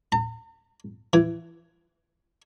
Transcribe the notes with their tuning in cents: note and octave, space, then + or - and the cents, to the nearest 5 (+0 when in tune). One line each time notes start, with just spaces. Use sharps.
A#5 -45
E3 +20